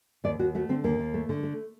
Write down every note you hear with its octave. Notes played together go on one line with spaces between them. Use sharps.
D#2 D5
D#2 F#4
A3 F#4
D3 C4
D#2 A#3
D#2
A3
D3
A3